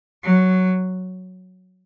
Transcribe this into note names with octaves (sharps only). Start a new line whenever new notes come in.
F#3